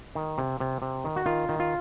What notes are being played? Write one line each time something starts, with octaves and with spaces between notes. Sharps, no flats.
D#3
C3
C3
C3
D#3
F#4
D#3 F4
D#3
F4